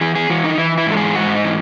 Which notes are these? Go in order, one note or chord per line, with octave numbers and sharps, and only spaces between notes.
E3 G#4
G#4
E3 F#4
D#4
E3 E4
E4
G#2
A4
G#4
G#2 F#4
D#4
E3